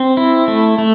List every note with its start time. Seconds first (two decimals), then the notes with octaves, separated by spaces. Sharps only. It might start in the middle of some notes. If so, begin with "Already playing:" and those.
Already playing: C4
0.17 E4
0.48 A3
0.78 A3